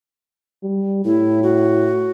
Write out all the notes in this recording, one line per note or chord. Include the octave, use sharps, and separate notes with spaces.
G3
A2 E4
F#4